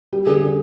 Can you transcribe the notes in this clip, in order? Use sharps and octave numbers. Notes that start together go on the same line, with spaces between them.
G3 G4
D3 G#4
D3